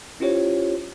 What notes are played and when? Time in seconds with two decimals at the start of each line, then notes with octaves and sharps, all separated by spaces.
0.20 C#4 E4 F4 G4 C5 C#5